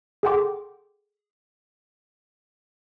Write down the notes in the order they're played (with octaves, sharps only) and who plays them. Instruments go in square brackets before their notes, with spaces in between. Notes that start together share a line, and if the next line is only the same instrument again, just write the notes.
[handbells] G#4 A4 F#5 G5 C6 D6